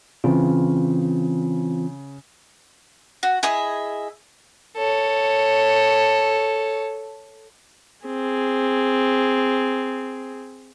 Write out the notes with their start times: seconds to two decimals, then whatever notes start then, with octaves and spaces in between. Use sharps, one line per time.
0.24 C#3 E3 C4 F4
3.23 F#4
3.43 E4 G#4 D#5 E5
4.77 A4 C#5
8.06 C4 G#4